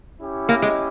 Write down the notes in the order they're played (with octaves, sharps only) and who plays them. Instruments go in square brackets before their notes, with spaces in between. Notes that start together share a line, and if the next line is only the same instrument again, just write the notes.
[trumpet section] C#4 E4 G4
[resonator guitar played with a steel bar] A#3
G#3